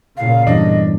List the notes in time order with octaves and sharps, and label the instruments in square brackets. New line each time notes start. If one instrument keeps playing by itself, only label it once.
[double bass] A#2 C#3 [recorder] F5
[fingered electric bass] E2 G2 [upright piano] D4 [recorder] D#5